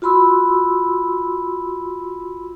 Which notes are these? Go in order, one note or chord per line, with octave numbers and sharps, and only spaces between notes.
F4 F#4 B5 C6 E6